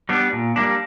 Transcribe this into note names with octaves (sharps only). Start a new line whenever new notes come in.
G3 B3 D4
A#2
G3 A#3 D4